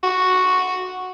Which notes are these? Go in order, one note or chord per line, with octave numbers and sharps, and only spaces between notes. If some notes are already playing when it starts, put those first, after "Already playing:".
F#4